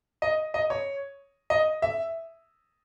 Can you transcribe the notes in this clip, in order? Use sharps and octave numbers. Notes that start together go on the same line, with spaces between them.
D#5
D#5
C#5
D#5
E5